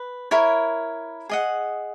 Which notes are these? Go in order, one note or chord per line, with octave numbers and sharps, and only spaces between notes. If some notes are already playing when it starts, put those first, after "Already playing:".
Already playing: B4
E4 A#4 C#5
G#4 D#5 F#5